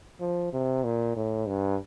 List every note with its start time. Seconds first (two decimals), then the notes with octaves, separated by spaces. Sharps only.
0.20 F3
0.53 C3
0.84 A#2
1.16 A2
1.48 G2